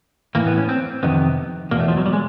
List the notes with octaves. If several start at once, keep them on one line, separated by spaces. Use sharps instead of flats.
A2 E3 A#3
B3
C#4
C4
F2 C3 D#3 B3
E2 B2 A#3
A3
F3
F#3
G3
G#3